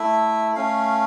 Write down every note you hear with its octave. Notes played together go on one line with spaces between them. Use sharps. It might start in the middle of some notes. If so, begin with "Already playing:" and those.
Already playing: A3 E4 E5
A3 C#4 F5